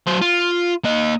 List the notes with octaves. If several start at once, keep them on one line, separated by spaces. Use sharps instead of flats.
F#3 C5
F4
A#3 D#5